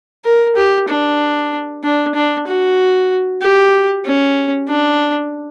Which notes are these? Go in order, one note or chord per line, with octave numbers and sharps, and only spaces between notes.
A#4
G4
D4
D4
D4
F#4
G4
C#4
D4